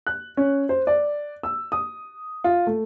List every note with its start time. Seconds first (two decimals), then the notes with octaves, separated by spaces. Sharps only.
0.07 F#6
0.37 C#4
0.69 C5
0.87 D5
1.43 E6
1.72 D#6
2.44 F4
2.67 A3